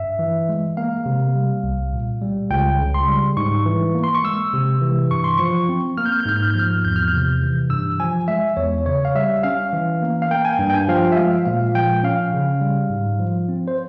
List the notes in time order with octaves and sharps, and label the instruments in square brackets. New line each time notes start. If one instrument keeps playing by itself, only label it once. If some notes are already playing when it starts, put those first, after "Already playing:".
Already playing: [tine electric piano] G2 E5
E3
G#3
A#3 F5
C3
G3
C2
A#2
G3
C#2 G5
C#3
C6
G3
G#2 C#6
E3
A#3
C6
C#6
G#3 E6
C3
E3
G2 C#6
C6
F3 C#6
C4
A#3 F6
G6
F6
G6
G#2 F6
G6
F6
G6
F3 F6
E2 G6
F6
G6
C3
E3
G2 E6
F3 G#5
G#3 E5
E2 C#5
C#3 C#5
F5
G3 E5
C#4 F5
E3
A#3
F5
A#3 G5
G#5
G5
G2
G5
G#5
F3 F5
G5
E5
G#3 F5
A#2 F5
F3 G5
C#4 F5
C#3
G3
G#2
F3
C4
C5